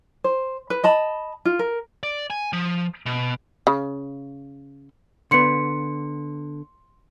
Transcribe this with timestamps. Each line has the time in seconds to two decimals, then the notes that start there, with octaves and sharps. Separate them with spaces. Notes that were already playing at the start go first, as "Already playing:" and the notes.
0.24 C5
0.70 B4
0.84 D#5 A5 B5
1.45 F4
1.59 A#4
2.03 D5
2.30 G#5
2.53 F3
3.06 B2
3.67 C#3
5.31 D3 B3 C6 C#7